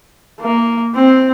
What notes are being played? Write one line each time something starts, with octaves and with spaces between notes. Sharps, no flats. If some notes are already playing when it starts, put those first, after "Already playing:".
A#3
C4